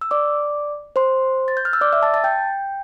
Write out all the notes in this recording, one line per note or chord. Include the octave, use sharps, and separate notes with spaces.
E6
D5 D6
C5 C6
A6
G6
F6
E6
D5 D6
E5 E6
A5 A6
A5 A6
G5 G6